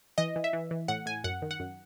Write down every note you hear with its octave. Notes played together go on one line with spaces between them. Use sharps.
E3 D#5
E3
E5
E3
E3
A2 F#5
A2 G#5
F#2 F#5
D#3
F#5
F#2